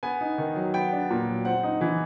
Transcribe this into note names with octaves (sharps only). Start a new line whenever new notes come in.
B3 G#5
D#4
D#3
F#3
B3 G5
D4
A#2
F#3
C4 F#5
D#4
E3